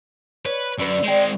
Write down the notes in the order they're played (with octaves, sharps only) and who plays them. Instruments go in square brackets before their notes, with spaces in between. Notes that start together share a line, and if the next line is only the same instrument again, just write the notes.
[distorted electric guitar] B4 [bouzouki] C#5
[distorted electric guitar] F#2 [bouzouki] D3 B4
[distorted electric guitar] G#3 C4 [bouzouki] D5 G5